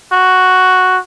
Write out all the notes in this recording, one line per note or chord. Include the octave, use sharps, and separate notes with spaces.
F#4